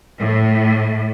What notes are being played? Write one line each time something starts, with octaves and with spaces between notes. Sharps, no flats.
A2